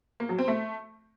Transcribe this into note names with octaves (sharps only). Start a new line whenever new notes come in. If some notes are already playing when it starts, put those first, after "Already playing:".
A#3
F#3
C4
A3